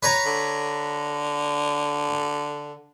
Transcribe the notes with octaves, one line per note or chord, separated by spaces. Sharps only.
B4 C#5 A#5
D3